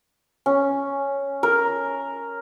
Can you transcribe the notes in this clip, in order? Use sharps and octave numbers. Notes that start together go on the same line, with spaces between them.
C#4
A#4